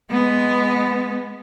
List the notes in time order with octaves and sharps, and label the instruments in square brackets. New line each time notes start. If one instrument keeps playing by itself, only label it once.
[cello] G#3 B3